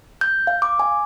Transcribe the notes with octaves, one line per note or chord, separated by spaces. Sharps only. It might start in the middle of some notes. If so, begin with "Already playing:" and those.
G6
F5
D6
G#5